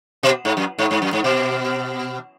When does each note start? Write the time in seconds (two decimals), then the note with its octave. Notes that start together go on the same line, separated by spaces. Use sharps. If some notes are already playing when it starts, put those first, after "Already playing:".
0.23 B2
0.45 G#2
0.57 F#2
0.78 G#2
0.91 G#2
1.02 F#2
1.13 G#2
1.24 B2